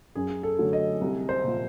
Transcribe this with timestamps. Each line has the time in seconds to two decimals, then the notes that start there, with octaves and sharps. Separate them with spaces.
0.15 F#2 G#4
0.43 A4
0.58 D3 F#3 A3 C#4
0.73 D#5
1.01 C2
1.29 C5
1.43 A#2 F3